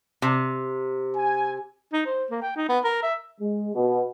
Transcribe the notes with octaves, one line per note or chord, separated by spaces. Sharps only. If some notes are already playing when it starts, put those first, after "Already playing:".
C3
G#5
D#4
C5
A#3
G5
D#4
B3
A#4
E5
G#3
B2